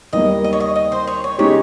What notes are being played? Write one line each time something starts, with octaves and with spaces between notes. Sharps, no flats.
D#2 D#3 G3 A#3 D#5
D#5
C#5
D#5
D#5
C5
C#5
C#5
C#3 G#3 D#4 G4 C#5